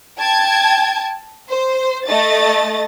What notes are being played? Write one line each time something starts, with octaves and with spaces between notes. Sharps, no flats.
G5 A5 G#6
C5
A3 D#5 A6